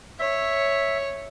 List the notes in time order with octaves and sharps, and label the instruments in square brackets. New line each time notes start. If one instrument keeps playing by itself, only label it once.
[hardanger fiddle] C#5 [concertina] E5